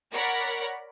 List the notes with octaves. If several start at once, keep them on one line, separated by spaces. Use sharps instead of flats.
A#4 C#5 D5 F#5 B5